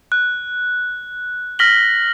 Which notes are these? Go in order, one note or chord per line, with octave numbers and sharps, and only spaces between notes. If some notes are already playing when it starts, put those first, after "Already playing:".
F#6
F6 A#6 B6 F#7 G7